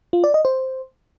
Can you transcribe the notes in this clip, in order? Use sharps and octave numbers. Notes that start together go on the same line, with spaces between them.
F4
D5
D#5
C5